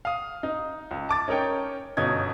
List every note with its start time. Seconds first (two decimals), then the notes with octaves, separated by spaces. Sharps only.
0.05 F5 D#6
0.43 D#4
0.91 C#2
1.09 A5 D6 A6
1.28 C#4 D#4 A#4 C#5 G5
1.97 G1 B2 C#4 D#4 G#6